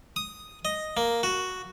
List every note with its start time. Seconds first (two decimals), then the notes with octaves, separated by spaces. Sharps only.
0.16 D#6
0.65 D#5
0.97 A#3
1.23 F#4